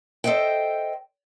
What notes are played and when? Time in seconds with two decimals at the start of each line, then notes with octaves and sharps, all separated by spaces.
0.24 A4 C5 D#5 E5 G5